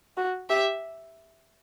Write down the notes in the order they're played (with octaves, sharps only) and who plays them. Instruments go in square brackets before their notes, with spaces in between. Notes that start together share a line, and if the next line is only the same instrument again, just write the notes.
[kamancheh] F#4
[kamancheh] G4 [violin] E5